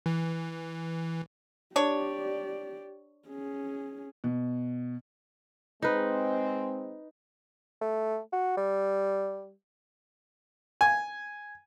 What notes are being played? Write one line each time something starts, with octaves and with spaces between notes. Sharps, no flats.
E3
D4 G4 C#5 D5
C#4 G#4
B2
G#3 C4 D#4 B4
A3
F#4
G3
G#5